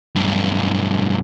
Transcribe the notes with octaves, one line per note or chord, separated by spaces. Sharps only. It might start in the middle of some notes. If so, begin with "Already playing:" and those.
B1 G2